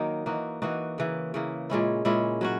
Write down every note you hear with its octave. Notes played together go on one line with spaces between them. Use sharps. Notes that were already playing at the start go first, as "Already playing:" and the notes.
Already playing: D#3 F#3 A#3 D#4
E3 A#3 D#4 F#4
E3 A#3 D#4 F#4
C#3 E3 A#3
C#3 E3 A#3
A#2 G#3 C#4 E4
A#2 G#3 C#4 E4
F#3 C#4 F#4